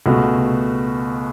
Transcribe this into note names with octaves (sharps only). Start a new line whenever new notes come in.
C#2 B2 A3 F#4